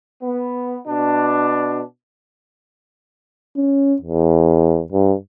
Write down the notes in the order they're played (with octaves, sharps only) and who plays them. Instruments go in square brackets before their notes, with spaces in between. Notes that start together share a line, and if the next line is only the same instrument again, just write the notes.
[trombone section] B3
B2 D4
[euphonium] C#4
E2
G2